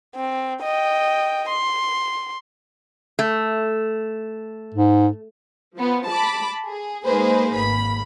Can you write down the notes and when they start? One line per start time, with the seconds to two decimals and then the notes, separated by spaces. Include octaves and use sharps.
0.15 C4
0.63 D#5 G5
1.49 C6
3.19 A3
4.74 G#2
5.74 F3 B3
6.08 A5 B5 D6
6.66 G#4
7.04 G#3 A#3 D#4 G#4 B4 C5
7.55 G#1 A#3 B5